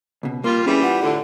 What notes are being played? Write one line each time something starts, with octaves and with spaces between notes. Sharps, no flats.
C#2 B2
G3 A#3 F4
E3 G3 C#4 G#4 B5
F4 F#5
A2 D3